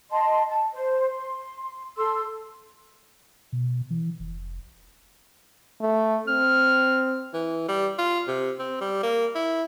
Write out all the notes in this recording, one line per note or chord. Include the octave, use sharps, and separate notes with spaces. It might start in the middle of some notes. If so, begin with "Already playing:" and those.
D#5 A5 C6
A5
C5
C6
A4 C6 E6
B2
E3
F1
A3
C4 F6
E3
G3
F4
C3
C4
G3
A#3
E4